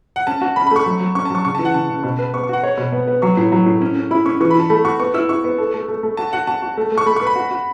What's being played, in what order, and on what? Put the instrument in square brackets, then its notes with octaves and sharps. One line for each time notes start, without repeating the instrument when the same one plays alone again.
[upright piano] F#5
[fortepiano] C#4 [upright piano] A5
[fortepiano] F#4
[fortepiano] C#4 [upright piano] B5
[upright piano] B5
[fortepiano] A3 [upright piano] C#6
[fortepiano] F#3
F#3
[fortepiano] C#4 [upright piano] C#6
[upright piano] A5
[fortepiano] F#3 [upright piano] C#6
[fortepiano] C#3 [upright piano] C#6
[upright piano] A5
[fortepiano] E3
[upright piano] F#5
[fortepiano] C#3 [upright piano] A5
[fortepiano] C#3
B2
B4
[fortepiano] B3 [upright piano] C#6
[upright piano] C#6
[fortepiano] F#4 [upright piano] F#5
[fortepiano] C#5
B2
B3
B3
[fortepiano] F#3 [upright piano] C#6
[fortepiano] A2
F#3
A2
C#4
C#4
[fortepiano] E4 [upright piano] B5
[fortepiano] C#4 [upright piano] C#6
[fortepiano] E3 [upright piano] C#6
[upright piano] B5
[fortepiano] E3 [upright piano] A5
[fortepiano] A3 [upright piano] B5
[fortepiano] F#4 [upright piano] C#6
[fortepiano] B3 [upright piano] C#6
[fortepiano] E4 [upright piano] E6
[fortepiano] E4 [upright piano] C#6
[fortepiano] B3
A4
A3
A3
A3
[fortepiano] F#4 [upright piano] A5
[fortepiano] F#4 [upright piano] F#5
[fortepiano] F#4 [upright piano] A5
[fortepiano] F#4
A3
A3
[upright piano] C#6
[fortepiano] A3 [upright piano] B5
[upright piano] C#6
[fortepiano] B4
[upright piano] B5
[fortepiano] F#4
F#4